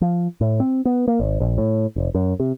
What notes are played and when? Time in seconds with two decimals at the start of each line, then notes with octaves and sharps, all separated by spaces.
0.01 F3
0.41 A2
0.60 C4
0.85 B3
1.08 A#3
1.20 G#1
1.40 A#1
1.58 A2
1.96 F1
2.15 F#2
2.40 C3